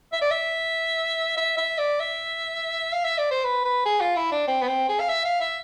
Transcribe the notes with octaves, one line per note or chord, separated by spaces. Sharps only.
E5
D5
E5
E5
E5
D5
E5
F5
E5
D5
C5
B4
B4
G#4
F4
E4
D4
C4
B3
C4
G#4
F5
E5
F5
E5